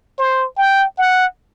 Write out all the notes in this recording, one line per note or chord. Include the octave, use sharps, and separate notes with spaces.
C5
G5
F#5